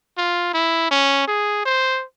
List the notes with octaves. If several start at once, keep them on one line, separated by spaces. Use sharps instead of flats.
F4
E4
C#4
G#4
C5